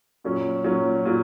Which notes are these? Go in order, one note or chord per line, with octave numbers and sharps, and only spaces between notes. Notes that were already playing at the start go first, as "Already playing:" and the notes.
A#2 F#3 C#4
A#2 F#3 C#4
A#2 F#3